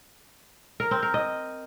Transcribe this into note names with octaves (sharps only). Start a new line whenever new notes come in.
A#4
C4
A#4
D#5